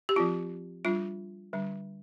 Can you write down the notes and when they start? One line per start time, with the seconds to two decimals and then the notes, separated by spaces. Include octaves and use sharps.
0.09 G4
0.16 F3 C4 F4
0.85 G3 D4 F4
1.53 D3 G3 D4